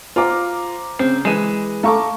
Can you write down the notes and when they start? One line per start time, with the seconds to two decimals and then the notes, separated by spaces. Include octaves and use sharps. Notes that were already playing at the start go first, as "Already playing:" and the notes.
0.16 F4 C5 A#5 D6
0.99 C#3 C4
1.25 E3 G#3 D#7 E7
1.83 A3 A4 F5 A#5 C#6 D6